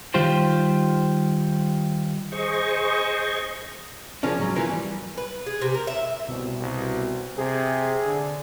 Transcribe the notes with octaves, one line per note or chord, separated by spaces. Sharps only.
D#3 G3 F4 G4 C5
G#4 C5 D#5 C#6
C#3 F3 A#3 C#4 D4
G#2 F#3
E3 A#3 B3 C#4 F4 A#4
G3
B4
G#4
C3
A#4
E5
C2 B2
C2
C3 G#4
D3